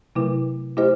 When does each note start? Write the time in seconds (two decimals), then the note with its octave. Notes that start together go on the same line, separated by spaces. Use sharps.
0.15 C3 F#3 A3 E4 B4
0.77 A3 E4 G4 C5 D#5